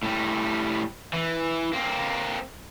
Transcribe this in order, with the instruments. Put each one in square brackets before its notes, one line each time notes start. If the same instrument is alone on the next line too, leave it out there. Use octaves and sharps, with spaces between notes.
[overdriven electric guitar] A2 G3
E3
A#3 C4